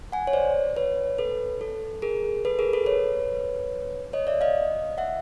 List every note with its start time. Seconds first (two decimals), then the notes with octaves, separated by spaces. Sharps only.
0.12 F#5 G#5
0.27 C#5
0.33 C5 D5
0.76 B4 C#5
1.18 A4 B4
1.61 A4
2.02 G#4 A#4
2.45 A4 B4
2.59 G#4 A#4
2.73 A4 B4
2.86 B4 C#5
4.13 C#5 D#5
4.27 D5 E5
4.41 D#5 F5
4.98 E5 F#5